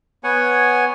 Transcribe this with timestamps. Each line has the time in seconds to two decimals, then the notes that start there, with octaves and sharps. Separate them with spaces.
0.24 B3 C#5 F#5 G#5